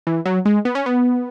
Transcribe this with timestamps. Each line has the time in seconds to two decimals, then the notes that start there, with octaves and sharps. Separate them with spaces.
0.07 E3
0.25 F#3
0.46 G#3
0.65 B3
0.75 C#4
0.86 B3